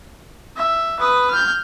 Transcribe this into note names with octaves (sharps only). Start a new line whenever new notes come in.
E5
B4 D#6
F6 G6